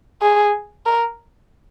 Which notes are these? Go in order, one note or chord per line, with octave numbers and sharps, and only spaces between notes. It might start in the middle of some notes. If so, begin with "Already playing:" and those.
G#4
A#4